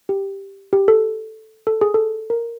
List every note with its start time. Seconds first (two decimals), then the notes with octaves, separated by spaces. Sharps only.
0.09 G4
0.73 G4
0.88 A4
1.67 A4
1.81 G#4
1.94 A4
2.30 A#4